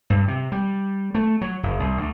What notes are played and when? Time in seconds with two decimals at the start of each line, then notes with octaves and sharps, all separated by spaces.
0.10 G2
0.28 C3
0.52 G3
1.15 A3
1.41 F#3
1.63 F#1
1.80 C2
1.97 D2